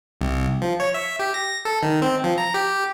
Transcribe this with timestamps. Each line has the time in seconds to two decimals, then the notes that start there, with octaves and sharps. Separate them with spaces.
0.21 C2
0.62 F3
0.80 C#5
0.94 E5
1.20 G4
1.34 A#6
1.65 A4
1.83 D#3
2.02 C4
2.24 F3
2.38 A#5
2.54 G4